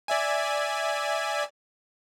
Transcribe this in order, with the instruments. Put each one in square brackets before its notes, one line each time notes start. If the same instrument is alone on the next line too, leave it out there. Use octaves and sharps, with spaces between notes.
[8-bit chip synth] D5 E5 G#5